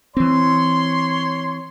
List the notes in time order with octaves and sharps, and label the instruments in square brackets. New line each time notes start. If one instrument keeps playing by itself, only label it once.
[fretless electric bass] E3 C4 [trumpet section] C#5 C6